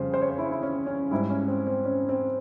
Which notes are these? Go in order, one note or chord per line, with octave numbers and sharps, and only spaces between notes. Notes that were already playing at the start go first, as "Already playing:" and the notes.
Already playing: F2 C#3 G3 C5
C5
C#5
C5
E4
E4
C#4
C#4
G#2 G3 E4
C#4
C4
C4
C#4
C4